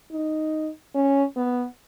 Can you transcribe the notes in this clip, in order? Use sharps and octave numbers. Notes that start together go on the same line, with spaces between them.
D#4
C#4
B3